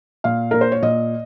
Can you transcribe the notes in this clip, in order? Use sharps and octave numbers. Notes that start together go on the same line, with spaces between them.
A#2 F5
A#2 A#4
C5
C#5
A#2 D#5